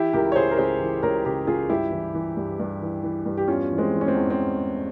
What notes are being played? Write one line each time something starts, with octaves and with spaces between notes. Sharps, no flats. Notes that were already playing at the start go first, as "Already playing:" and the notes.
Already playing: E3 E4 G4
C#2 G4 A#4
C#5
C#3 G#4 C5
A#4
C#2 G#4 C5
E3
C#2 A#4 C#5
C#3 G4 A#4
C#2 F4 G#4
G2 E4 G4
E3
E3
G2
G2
E3
E3
G2
G4
E2 C#4 F4
E3
G#3 C4
E3
C#4
G#3 C4
E2
C4